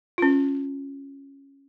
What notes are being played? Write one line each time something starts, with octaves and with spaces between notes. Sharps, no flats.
C#4 F4